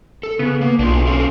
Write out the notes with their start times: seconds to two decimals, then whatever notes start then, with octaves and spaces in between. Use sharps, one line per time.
0.23 A4
0.39 C#3 B3
0.61 A#3
0.79 B1 D4 F4
1.07 C#4 A4 F5